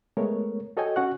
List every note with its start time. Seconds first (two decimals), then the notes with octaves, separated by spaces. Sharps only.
0.17 G#3 A3 B3 A#4 C#5
0.77 F#4 A4 C#5 D#5 G5 G#5
0.96 C#4 F#4 F#5 C#6 F#6